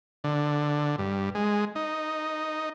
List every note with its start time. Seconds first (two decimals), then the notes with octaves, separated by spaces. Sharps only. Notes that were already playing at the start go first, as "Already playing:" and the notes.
0.24 D3
0.98 G2
1.35 G#3
1.75 D#4